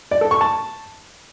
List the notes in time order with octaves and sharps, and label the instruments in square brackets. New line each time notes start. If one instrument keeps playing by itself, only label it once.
[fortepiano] D5
A4
C#6
A5